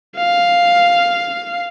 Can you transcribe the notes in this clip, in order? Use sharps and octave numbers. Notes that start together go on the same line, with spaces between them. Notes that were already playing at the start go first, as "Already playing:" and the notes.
F5